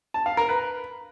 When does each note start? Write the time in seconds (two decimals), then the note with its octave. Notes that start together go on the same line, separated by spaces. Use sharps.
0.14 A5
0.26 F5
0.37 A#4
0.49 B4